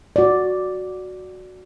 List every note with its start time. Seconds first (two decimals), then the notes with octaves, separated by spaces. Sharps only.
0.16 F#4 D5